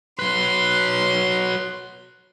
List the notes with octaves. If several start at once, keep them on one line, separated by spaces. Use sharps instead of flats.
F#3 B4 C6